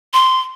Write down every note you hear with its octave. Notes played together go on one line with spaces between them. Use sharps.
C6